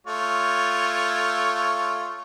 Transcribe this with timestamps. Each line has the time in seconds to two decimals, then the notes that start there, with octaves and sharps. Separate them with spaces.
0.07 A3 F4 C#5